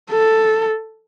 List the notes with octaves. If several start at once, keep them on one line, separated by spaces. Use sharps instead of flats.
A4